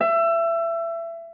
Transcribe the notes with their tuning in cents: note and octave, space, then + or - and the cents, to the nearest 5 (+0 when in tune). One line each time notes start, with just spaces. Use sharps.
E5 +25